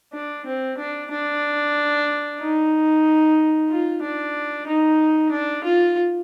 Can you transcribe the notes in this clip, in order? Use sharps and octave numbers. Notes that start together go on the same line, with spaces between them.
D4
C4
D4
D4
D#4
F4
D4
D#4
D4
F4